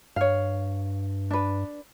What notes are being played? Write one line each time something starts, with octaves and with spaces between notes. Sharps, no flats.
G2 C#5 F5
D4 B4